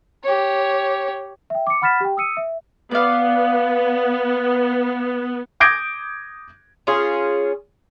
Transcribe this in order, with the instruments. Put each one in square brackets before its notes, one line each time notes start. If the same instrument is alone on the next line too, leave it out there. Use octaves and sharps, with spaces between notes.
[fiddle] G4 C#5
[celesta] E5 G5
D6 C#7
F#5 B5 F6 A6 B6 E7
G4 G5
D#6 E6 C#7 D#7
E5
[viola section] B3 [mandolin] D5 F5
[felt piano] D6 D#6 G6 G#6 A#6 D7
[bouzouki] C#4 F4 G#4